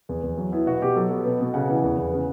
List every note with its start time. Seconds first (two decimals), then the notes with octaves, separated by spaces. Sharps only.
0.09 E2
0.23 E2
0.37 F#3
0.52 B3 E4
0.67 B2 F#4
0.82 B2 G4
0.96 F#3 A4
1.11 B3
1.25 B2 B4
1.40 B2
1.54 C#3 F#5
1.68 E3
1.84 E2
1.98 E2
2.13 C#3